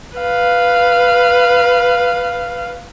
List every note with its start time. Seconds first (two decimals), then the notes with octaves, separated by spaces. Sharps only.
0.18 B4 F5